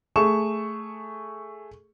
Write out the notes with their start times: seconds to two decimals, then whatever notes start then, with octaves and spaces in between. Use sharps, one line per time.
0.16 A3 G#4 C#6 E7